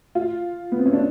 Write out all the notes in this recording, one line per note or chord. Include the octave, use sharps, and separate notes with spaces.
F4
B3
C4
C#4
D4